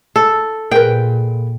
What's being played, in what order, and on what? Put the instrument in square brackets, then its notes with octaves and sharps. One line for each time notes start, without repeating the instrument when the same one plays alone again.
[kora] A4
[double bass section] A#2 [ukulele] G#4 A#4 B4 [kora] G5